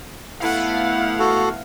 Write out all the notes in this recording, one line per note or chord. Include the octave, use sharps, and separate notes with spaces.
A3 B3 E4 F5 F#5
F#4 A4